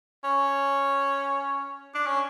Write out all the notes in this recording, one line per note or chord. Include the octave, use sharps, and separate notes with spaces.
C#4
D4
C#4